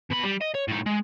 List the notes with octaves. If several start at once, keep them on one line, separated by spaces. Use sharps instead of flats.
B2 B5
G3
D#5
C#5
A2 D#4
G#3